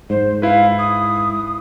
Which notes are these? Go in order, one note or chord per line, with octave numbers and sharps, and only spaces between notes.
G#2 C5
E4 B4 F5
D#6